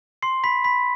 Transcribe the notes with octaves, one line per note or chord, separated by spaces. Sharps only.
C6 C7
B5 B6
B5 B6